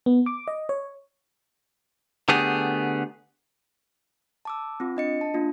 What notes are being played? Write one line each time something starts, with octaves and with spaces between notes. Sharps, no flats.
B3
D6
D#5
C#5
D3 A3 B3 G4 G#4
A5 D6 E6
C4 F4
D4 D#5 C#7
A5
A#3 D4 F4